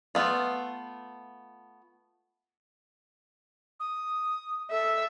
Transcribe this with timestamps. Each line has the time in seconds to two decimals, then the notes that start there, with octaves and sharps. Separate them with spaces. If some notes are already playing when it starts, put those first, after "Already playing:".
0.15 A3 B3 F4
3.80 D#6
4.71 A4 E5